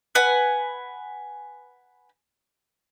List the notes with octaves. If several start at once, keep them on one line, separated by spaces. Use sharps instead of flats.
B4 F#5 G#5